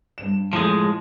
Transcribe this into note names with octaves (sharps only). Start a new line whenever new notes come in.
G2 E7
A2 F3 G#3